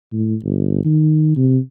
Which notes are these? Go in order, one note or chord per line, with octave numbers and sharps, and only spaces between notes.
A2
G1
D#3
C3